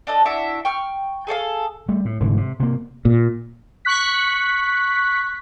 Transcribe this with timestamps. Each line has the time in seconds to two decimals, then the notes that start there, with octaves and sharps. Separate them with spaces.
0.07 D4 A4 D#5
0.25 D4 E4 F#4 E5
0.65 G5 C#6 F6
1.27 G#4 A4 C#5 F5
1.89 G3 A3
2.05 A2
2.20 F1 G#2 D3 E3
2.37 C3
2.60 C3 A#3
3.05 A#2
3.85 C#6 F#6 B6